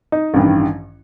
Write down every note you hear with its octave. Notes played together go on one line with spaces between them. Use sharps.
D#4
A1 G2 D#3